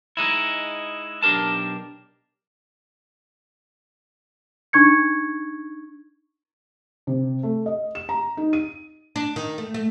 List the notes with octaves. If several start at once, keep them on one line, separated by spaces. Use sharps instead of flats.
G#3 D#4 E4
B1 D4 G4 A#4 A5
D4 D#4 C#6 G#6 C#7
C3
A3
D#5
E7
A#5
D#4
D#7
D4
D#3
A3
A3